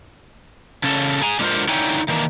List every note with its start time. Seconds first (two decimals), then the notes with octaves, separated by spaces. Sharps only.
0.84 C#3 C#4 A4
1.22 G#4 G#5 A#5
1.39 D3 G#3 F4 A#4 C5
1.68 D3 D#4 E4 C#5 G5 G#5
2.08 D#3 E3 A#3 D4